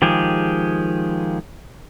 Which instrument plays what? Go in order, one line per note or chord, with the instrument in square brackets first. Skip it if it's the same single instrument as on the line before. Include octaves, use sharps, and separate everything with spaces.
[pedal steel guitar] D#3 F3 G#3 G4 G#4